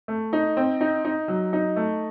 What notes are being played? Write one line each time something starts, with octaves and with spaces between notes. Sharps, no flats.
A3
D#4
C4
D#4
D#4
F#3
D#4
A3